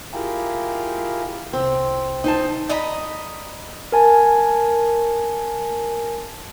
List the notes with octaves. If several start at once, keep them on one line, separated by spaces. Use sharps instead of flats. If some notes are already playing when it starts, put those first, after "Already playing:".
E4 F4 G4 G#4 A#4
C2 C4
D#4 C5 A5
D5 D#5 A#5 B5
A#4 G#5 A5